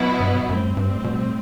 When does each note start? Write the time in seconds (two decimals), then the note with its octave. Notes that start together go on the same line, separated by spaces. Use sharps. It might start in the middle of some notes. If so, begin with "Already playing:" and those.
Already playing: B2 F#3 B3 E4
0.20 G2
0.49 F#2 A2 G3 C4
0.77 G2
1.04 B2